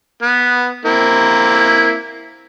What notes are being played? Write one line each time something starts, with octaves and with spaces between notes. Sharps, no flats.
B3
A#3 C4 E4